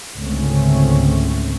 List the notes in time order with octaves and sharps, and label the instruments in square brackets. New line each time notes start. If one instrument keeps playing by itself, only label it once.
[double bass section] C#2 G#2 D3 A3 C4 C#4